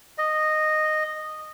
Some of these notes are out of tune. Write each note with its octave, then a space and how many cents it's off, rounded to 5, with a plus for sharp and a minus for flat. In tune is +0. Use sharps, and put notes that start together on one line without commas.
D#5 -10